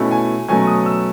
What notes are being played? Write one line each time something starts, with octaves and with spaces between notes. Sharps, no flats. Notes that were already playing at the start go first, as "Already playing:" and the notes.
Already playing: B2 A3 C#4 E4
G#5
B2 F#3 A3 C#4 G#5
D#6
E6